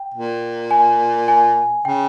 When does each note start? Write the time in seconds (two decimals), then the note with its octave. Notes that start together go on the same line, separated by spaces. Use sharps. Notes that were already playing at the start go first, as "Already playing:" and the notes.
Already playing: G5
0.14 A#2
0.71 G#5
1.28 G#5
1.85 C#3 G5